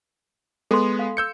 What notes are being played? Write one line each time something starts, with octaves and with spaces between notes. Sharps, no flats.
G#3 B3 A4 C6
F5
E6 G6 C#7